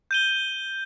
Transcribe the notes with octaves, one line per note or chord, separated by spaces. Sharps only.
G6 D#7 G7